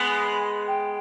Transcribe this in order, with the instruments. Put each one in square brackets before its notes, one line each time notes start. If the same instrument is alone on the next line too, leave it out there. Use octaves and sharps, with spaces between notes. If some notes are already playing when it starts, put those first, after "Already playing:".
Already playing: [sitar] G#3 B3 [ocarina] G#5
[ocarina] G5